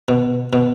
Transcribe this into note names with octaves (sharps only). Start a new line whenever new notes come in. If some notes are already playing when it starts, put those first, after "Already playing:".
B2
B2